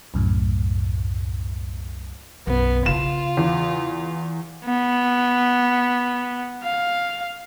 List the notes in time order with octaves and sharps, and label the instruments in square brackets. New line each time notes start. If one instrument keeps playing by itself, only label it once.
[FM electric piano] C2 F#2 A2
[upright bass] B1 F#2 [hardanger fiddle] B3
[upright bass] C#3 E4 [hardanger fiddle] F4 [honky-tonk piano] E7
[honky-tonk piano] E2
[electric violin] B3
F5